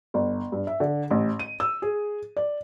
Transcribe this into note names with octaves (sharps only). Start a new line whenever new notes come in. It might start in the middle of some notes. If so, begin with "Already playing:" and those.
G1
G2
E5
D3
A1
D#7
E6
G#4
D5